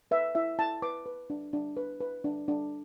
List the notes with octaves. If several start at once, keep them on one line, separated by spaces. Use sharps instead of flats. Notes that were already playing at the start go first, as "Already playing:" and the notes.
B4 E5
E4 E5
E4 A5
B4 D6
B4
D4
D4
B4
B4
D4
D4